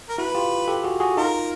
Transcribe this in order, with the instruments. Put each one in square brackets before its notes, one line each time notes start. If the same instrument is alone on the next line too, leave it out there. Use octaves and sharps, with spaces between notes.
[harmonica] A#4
[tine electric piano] E4 F#4 [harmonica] B4
[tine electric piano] F4 G4
G4 A4
F#4 G#4
F#4 G#4
[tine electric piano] D#4 F4 [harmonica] A#4